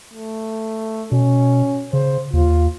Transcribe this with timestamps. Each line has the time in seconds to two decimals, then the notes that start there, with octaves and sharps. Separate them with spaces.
0.13 A3
1.12 B2 C#4
1.93 C#3 C5
2.33 D#2 F4